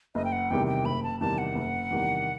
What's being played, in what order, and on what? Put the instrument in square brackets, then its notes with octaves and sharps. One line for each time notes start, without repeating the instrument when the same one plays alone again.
[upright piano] F#1 [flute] D#5
[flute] G5
F#5
[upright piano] E2 C3 D#3 G3 [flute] G5
[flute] G5
[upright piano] F#1 [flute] B5
[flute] A5
[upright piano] E2 C3 D#3 G3 [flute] A5
[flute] F#5
[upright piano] F#1
E2 C3 D#3 G3